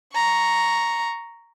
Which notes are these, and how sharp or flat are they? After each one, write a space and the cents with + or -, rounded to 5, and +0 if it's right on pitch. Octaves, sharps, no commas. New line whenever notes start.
A#5 +0 C#6 +0